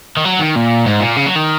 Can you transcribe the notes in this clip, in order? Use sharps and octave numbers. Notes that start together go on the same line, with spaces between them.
D#3
F#3
D#3
A#2
G#2
A#2
C#3
F#3
D#3